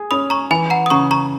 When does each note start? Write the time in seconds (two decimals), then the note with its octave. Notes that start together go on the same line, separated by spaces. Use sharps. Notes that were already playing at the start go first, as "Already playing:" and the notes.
Already playing: G#4
0.11 C#4 B5 D#6
0.30 A#5 C#6
0.51 E3 G#5 B5
0.70 F#5 A#5
0.86 D#6
0.90 C#3 A#5 C#6
1.11 A#5 C#6